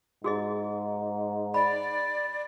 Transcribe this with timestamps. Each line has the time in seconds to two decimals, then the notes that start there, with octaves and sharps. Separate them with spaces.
0.24 G#2 F#4 G#4 D#5
1.54 D5 B5